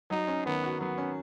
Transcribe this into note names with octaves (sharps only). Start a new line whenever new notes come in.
F#3 D#4
C#4
D#3 B3
F#4
F#3 B3
C#4